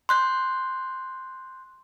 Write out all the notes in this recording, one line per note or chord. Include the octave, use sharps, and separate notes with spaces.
C6 F#6 G6